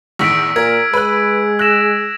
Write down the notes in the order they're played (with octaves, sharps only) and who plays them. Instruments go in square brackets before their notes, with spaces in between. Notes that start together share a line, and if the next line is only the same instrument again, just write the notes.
[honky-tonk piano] E2 A2 D#3 [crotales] E6 B6 D7
[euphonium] A#2 [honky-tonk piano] A#4 [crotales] G#6
[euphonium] G#3 [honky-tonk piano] B4 F#6
[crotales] E6 A#6 E7 [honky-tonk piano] F#6